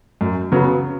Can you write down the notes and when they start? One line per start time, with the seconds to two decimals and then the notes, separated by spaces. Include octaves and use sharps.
0.21 F#2
0.52 C#3 F#3 B3